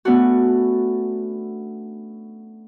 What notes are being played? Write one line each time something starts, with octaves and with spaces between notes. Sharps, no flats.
A3 B3 C#4 D4 F#4